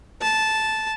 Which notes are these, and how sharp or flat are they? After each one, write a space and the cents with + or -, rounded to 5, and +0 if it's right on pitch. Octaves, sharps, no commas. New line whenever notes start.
A5 -10